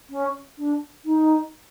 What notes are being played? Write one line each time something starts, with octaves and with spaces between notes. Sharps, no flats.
C#4
D4
D#4